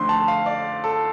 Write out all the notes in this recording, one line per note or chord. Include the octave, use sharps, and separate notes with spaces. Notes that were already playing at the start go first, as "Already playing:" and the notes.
Already playing: F2 D3 A3 C6
A5
F5
D5
A4